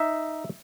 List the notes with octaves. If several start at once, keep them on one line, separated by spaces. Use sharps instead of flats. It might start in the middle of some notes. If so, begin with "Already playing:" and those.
Already playing: D#4 E5